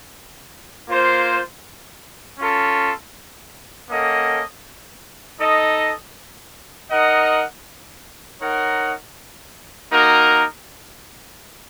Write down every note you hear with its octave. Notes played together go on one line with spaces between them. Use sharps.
A#3 F4 C5
C#4 F4 A4
A#3 C#4 A4 D#5 F#5
D#4 A4 D#5
D#4 A#4 D#5 F#5
D#4 A#4 C#5 F#5
A#3 D#4 F#4 A#4